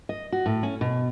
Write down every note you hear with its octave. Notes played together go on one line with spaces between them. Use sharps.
D#5
F#4
A2
C#4
B2